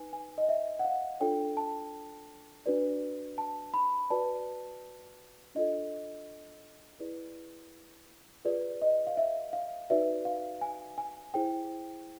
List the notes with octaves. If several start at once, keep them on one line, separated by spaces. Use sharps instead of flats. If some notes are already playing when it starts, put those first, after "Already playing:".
Already playing: D#4 B4 G#5
G#5
D#5
E5
F#5
F5
D4 F4 A4 C#5 G5
A5
D4 F#4 B4 D5
A5
B5
F#4 B4 D5 A5
D4 F4 A4 D#5
E4 G#4 B4 D5
F4 G#4 B4 D5
D#5
F5
E5
F5
D#4 F#4 B4 D5 E5
F5
G#5
G#5
E4 G#4 C5 G5